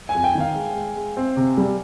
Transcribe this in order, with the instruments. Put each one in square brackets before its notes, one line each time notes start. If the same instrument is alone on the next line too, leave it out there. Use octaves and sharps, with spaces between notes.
[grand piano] G#5
[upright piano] F2
[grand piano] G5
[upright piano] D#3
[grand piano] F5
[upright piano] G#3
G#3
G#3
C4
C3
G3